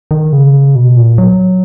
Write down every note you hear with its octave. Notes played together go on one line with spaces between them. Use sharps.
D#3
C#3
B2
A#2
F#3